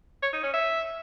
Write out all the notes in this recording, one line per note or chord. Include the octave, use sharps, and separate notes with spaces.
C#5
D#4
C#4
E5